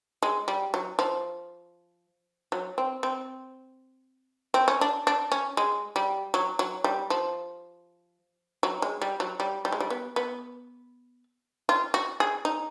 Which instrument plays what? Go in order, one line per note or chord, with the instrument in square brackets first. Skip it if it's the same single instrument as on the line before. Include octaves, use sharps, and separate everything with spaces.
[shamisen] G#3
G3
F#3
F3
F#3
C4
C4
C4
C#4
D4
D4
C#4
G#3
G3
F#3
F#3
G3
F3
F#3
G#3
G3
F#3
G3
G3
G#3
G3
B3
B3
F4
F#4
G#4
D#4